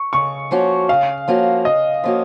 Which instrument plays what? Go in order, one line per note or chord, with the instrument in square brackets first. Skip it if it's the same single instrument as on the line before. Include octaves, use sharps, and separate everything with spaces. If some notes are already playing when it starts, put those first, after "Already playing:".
Already playing: [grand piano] C#6
[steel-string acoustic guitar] C#3 [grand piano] C#6
[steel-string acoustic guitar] F3 A#3 C#4 F#4
[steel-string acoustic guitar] C#3 [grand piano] F5
[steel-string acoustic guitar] F3 A#3 C#4 F#4
[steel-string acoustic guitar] C#3 [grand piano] D#5
[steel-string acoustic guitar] F3 A#3 C#4 F#4